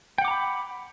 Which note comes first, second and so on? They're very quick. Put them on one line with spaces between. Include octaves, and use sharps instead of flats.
G5 F#5 D6 A#5 B5